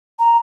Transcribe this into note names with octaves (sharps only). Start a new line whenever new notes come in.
A#5